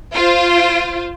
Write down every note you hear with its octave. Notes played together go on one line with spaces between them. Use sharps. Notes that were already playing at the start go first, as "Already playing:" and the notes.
F4 C5